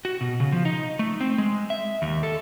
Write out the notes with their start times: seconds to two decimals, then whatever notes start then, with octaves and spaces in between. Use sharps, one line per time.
0.05 F#4
0.21 B2
0.40 C#3
0.52 F3
0.65 D#4
0.99 A3
1.21 C4
1.38 G#3
1.70 E5
2.02 D#2
2.23 A4